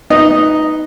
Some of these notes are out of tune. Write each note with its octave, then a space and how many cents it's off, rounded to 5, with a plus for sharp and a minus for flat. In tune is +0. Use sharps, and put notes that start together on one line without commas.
B3 +0 D#4 +0